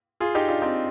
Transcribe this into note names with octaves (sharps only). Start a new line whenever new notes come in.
F4 G#4
D#4 G4
D4 F4
C4 D#4